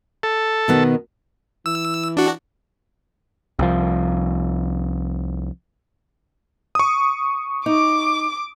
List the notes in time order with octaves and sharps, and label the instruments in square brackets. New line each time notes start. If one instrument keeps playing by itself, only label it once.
[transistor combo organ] A4
[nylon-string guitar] B2 D#3 B3
[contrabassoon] E3 [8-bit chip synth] E6
[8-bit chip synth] D4 F#4
[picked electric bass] C2 F3
[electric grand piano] C#6 D#6
[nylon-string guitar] D#4 [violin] D6